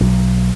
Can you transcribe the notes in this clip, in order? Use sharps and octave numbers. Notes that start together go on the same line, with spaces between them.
B1